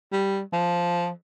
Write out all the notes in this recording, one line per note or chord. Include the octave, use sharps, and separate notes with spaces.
G3
F3